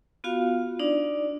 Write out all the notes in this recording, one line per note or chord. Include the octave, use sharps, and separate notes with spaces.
B3 F4 F#4 F5
D4 D#4 D5